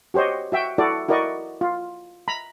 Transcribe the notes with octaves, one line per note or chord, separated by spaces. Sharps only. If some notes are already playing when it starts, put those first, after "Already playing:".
F#4 G4 C5 C#5 D#5
F#4 E5 G5
E4 F#4 A4 D5
E4 F#4 A#4 D5 D#5 C#6
F4
A#5 B5